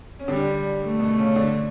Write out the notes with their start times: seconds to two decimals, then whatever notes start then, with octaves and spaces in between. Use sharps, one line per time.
0.20 C#4
0.28 D3 G3 D4
0.82 A3
0.99 B2 B3
1.18 C#3 C#4
1.35 D3 D4